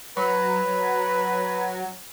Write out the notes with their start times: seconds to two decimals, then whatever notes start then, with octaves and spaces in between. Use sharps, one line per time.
0.17 F#3 B4